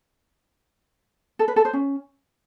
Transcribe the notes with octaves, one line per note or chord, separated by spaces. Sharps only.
A4
B4
A4
C5
C#4